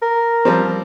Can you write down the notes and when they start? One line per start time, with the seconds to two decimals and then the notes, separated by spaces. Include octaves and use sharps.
0.02 A#4
0.45 F3 G3 C4